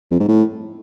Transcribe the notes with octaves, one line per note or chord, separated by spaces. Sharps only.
F2
G#2
A2